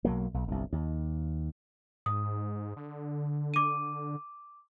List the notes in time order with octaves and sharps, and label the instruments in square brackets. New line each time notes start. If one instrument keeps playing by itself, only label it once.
[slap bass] B1 F#3 A#3
B1
G1 C2
D#2
[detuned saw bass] G#2 [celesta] D#6
[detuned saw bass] D3
[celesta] D6 D#7